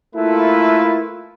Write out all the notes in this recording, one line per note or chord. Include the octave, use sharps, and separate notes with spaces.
A3 A#3 E4 F4 A4 B4